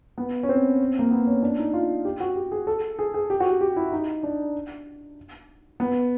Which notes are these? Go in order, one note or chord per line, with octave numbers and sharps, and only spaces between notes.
B3
C#4
C4
A#3
B3
C#4
D4
D#4
F4
G4
F#4
G4
G#4
A4
G#4
G#4
G4
F#4
G4
G4
E4
D#4
D4
B3